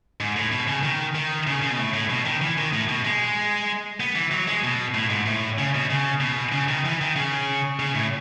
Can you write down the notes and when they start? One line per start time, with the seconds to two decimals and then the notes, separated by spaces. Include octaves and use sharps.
0.20 G#2
0.36 A2
0.51 B2
0.67 C#3
0.83 D#3
1.15 D#3
1.47 C#3
1.62 C#3
1.70 B2
1.78 A2
1.94 A2
2.10 B2
2.25 D#3
2.41 E3
2.57 D#3
2.72 A2
2.89 B2
3.05 G#3
4.00 B3
4.15 E3
4.31 F#3
4.48 G#3
4.64 B2
4.94 A2
5.10 G#2
5.26 A2
5.58 C#3
5.74 B2
5.90 C#3
6.21 B2
6.52 C#3
6.68 D#3
6.85 E3
7.01 D#3
7.16 C#3
7.80 C#3
7.95 A2